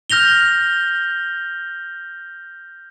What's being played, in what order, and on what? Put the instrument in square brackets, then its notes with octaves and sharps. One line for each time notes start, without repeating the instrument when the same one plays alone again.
[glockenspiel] F6 G6 A#6 F7 G7